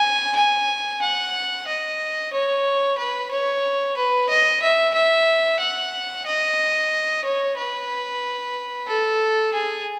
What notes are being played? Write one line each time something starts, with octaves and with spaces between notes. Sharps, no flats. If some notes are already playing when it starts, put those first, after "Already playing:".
Already playing: G#5
G#5
F#5
D#5
C#5
B4
C#5
B4
D#5
E5
E5
F#5
D#5
C#5
B4
A4
G#4